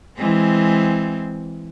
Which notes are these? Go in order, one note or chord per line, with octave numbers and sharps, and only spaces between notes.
E3 G#3 C4